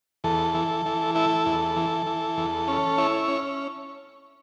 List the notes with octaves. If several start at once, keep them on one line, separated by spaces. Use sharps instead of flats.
E2 A4
E3
E3
E4 A4
E2
E3
E3
E2
C#4
E4 C#5
C#4